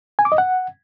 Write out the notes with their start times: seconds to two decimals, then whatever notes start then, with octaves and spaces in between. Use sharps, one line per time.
0.19 G#5
0.25 D6
0.32 D#5
0.38 F#5